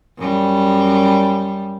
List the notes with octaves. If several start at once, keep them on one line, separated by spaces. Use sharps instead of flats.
F#2 G3